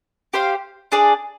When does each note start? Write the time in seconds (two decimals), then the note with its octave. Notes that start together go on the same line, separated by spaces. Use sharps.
0.34 G4 C5 F5
0.92 D4 G#4 D5